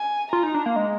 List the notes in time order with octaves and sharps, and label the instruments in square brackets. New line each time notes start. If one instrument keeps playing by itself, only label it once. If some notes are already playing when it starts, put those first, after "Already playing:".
Already playing: [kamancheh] G#5
[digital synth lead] F4 [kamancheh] A#5
[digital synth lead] D#4
D4
A#3
G#3